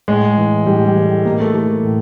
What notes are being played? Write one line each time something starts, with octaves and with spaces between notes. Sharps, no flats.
A2 G#3
E3
A2 G3
G3
E3
A3
A2 A#3
A3
E3 A3
A2